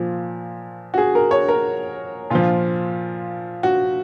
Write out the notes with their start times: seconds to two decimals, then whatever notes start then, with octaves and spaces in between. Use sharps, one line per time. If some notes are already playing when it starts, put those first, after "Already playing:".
Already playing: A#2 F3
0.94 F#4
0.98 G#4
1.15 A#4
1.31 C#5
1.49 A#4
2.30 A#2 F3 F4
3.63 F#4